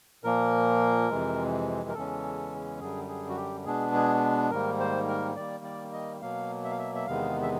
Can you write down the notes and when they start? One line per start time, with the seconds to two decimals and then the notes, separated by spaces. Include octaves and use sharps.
0.24 A#2 F3 A#3 A#4
1.10 F2 C3 E3 G#3
1.89 A#4
1.94 E2 C#3 E3 G#3 C#4 A4
2.80 F#2 D3 G3 G#4
3.08 G#4
3.29 F#4
3.37 G4
3.65 B2 G#3 B3 D4 G#4
3.94 G#4
4.51 G#2 D#3 G3 A#3 A#4
4.80 C5
5.08 A#4
5.36 D#3 G3 A#3 D5
5.64 D5
5.93 D#5
6.21 B2 F#3 A#3 F5
6.64 E5
6.71 F5
6.79 E5
6.95 E5
7.07 E2 C3 D#3 G#3 B3 F5
7.43 E5